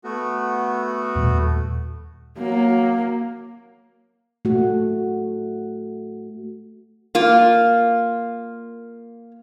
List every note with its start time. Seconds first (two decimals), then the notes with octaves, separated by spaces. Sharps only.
0.04 A3 B3 F#4
1.16 D#2 A#2 G3
2.38 F#3 A#3
4.45 A3 F#4
7.15 A#3 F4